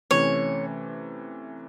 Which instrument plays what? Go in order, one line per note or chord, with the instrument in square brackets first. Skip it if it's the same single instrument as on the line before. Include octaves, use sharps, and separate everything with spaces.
[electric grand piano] C3 E3 A3 C#4 [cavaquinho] C#5